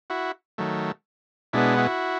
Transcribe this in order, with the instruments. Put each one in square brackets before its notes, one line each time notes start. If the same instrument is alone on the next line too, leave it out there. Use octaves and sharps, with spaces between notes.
[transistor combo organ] E4 F#4
D#3 F#3 A3
B2 G#3 B3 D4 E4
E4 F#4